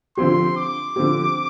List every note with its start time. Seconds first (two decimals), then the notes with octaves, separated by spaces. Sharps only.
0.17 D3 F3 C4 G4 C6
0.57 D6
0.96 D3 F3 C4 G4